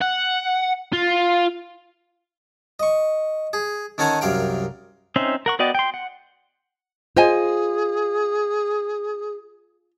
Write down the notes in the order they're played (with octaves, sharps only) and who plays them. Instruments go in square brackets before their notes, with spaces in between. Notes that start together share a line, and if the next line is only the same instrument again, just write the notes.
[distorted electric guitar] F#5
F4
[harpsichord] D#5 C#6
G#4
D#3 C#4 A4 F#5 G#5 A#5
C2 F#2 A#4 F5 G5
[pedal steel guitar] C4 C#4 D#4 C5 E5
A#4 F#5 C#6
B3 F#4 D5 D#5 G5
G5 C6
F#5
[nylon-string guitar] F4 [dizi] G#4 [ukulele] C5 D#5 G#5